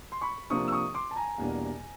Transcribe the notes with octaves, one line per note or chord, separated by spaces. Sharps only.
C6
B5 C#6
C3 F3 A#3 D4 F4 C#6 D#6
E6
C#6 D#6
C6 D6
A5
G#5 A#5
E2 B2 G3 A#3 D4